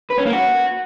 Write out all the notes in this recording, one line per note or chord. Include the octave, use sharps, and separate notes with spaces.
B4
C#4
A#3
F#4